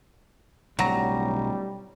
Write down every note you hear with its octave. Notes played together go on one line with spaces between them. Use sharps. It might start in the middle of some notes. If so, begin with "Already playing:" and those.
D1 B1 F#3 G3 A#5